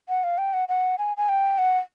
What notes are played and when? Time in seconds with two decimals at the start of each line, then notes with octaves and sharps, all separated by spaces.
0.09 F#5
0.24 F5
0.38 G5
0.53 F#5
0.69 F#5
0.98 G#5
1.17 G#5
1.29 G5
1.58 F#5